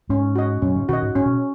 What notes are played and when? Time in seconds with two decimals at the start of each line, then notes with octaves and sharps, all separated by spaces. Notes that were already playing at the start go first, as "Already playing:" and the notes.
0.09 G#2 C#4
0.35 F#4 D#5
0.62 F#2 B2 C#4
0.76 G#2 C#3
0.89 B2 D#3 F#4 D#5
1.02 G#2
1.15 G#2 C#4
1.26 B2